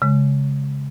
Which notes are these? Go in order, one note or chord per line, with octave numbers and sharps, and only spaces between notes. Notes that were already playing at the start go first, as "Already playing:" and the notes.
C#3 G#3